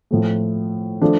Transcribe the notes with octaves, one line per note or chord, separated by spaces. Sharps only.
A2 F3 A3
F3 A3 D4 A4